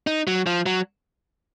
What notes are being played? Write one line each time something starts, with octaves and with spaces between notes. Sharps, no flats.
D#4
F#3
F3
F#3